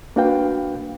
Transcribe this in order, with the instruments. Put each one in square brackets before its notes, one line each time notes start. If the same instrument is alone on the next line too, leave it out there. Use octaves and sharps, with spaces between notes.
[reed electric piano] A#3 D4 F#4 B4 F5 G5